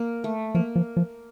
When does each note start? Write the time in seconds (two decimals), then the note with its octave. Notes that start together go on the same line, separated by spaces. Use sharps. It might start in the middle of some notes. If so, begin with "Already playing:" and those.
Already playing: A#3
0.24 A3
0.55 F3 A#3
0.76 F3
0.97 F3